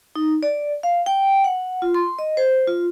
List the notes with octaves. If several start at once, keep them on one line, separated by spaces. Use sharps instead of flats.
D#4
D5
F5
G5
F#5
F4
C6
D#5
C5
F4